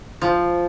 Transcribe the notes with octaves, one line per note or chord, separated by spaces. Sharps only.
F3